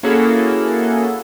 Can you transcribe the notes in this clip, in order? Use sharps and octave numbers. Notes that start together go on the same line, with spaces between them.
A#3 C#4 E4 F#4 G#4 A4